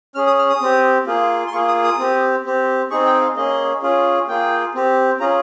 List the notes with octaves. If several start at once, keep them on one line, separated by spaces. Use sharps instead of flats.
C#4 G#4 F6
D#6
F6
D#6
C4 G4
A#3 F4 G#4
C6
A#3 F4 G#4 C#6
D#6
D#6
C4 G4
C4 G4
C4 D#4 G#4 C#6
G5
F5
A#3 C#4 G#4 D#5
C#4 F4 G#4
A#3 F4 G#4 G5
C4 G4
C#4 F4 G#4 A#5